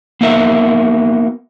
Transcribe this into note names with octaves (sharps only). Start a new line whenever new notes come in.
A#3 B3 D#4 F#4 A#4 E5